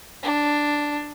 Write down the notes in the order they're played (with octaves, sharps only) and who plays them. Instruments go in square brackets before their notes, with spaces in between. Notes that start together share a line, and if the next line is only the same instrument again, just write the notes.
[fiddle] D4